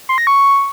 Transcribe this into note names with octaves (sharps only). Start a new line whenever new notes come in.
C6
A#6
C#6